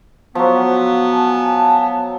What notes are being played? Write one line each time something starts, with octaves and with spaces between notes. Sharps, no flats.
F3 F#3 B3
G#5 A5